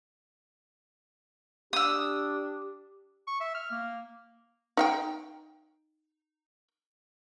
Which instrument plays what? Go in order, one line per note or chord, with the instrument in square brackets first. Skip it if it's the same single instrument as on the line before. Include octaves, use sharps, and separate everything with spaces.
[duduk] D4 [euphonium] G4 [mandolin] D#6 E6
[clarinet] C#6
E5
F6
A#3
[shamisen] D#4 F5 G5